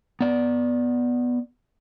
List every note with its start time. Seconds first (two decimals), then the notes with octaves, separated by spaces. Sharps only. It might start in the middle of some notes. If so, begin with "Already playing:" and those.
0.21 B3 D5